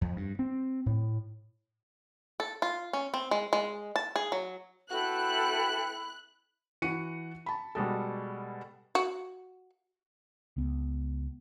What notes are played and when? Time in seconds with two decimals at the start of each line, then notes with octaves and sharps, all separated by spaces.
0.01 F2
0.16 G2
0.39 C4
0.86 A2
2.40 A4
2.62 F4
2.93 C#4
3.14 C4
3.31 G#3
3.53 G#3
3.96 A5
4.16 G#4
4.32 F#3
4.91 E4 F#4 A4 B4 G5 F#6
6.82 E3 F#4 F#5 C#7 D#7
7.46 A5 B5
7.75 B2 G3 G#3 A4
8.95 F#4
10.57 C#2 B3